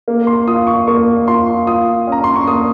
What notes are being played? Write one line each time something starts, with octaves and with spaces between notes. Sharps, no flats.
A#3
C6
F4 D#6
C#6
A#3 C#6
F4 C6
F4 D#6
C#4
A#5
C6
C#6
A#3 D#6